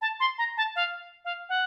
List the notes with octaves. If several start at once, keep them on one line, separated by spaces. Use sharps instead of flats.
A5
C6
A#5
A5
F5
F5
F#5